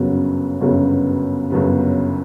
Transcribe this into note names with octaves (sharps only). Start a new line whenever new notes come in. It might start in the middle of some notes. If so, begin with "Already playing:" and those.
Already playing: G1 F#2 C#3 F#3 B3
G1 F#2 C#3 F#3 B3
G1 F#2 C#3 F#3 B3